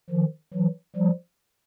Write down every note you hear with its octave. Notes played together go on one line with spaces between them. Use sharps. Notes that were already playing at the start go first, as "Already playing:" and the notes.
D#3 F3
E3 F#3
F3 G3